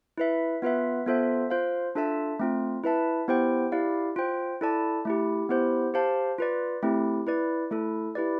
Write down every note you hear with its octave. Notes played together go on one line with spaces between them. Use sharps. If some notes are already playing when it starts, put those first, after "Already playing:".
E4 B4 E5
B3 F4 B4 E5
B3 F4 A4 C5 E5
F4 C5 F5
D4 F4 A4 E5 A5
A3 C4 F4
E4 B4 E5 A5
B3 E4 G4 C5 G5
E4 G4 D5 F5
F4 C5 G5
E4 A4 D5 A5
A3 E4 G4
B3 E4 G4 C5
G4 C5 F5 A5
F4 B4 D5
A3 C4 E4 G4
E4 B4 D5
A3 E4 A4
E4 G4 B4 D5